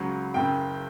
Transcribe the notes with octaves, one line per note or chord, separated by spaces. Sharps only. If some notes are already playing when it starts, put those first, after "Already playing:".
Already playing: C#2 C#3 F#3
F#1 F#2 C#3 G5